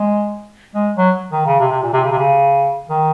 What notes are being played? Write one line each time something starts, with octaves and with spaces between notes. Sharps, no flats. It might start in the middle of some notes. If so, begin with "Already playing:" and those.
Already playing: G#3
G#3
F#3
D#3
C#3
C3
C3
A#2
C3
C#3
C3
C#3
D#3